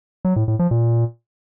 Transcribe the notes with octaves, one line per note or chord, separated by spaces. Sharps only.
F#3
A2
A2
F3
A#2